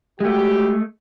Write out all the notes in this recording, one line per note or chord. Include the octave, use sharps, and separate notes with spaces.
G#3 A3 F#4 G4